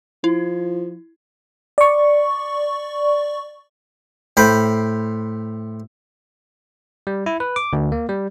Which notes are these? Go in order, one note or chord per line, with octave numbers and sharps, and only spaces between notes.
F3 E4
D5 C#6
A2 C5 G5 B5
G3
E4
B4
D6
D2
A#3
G3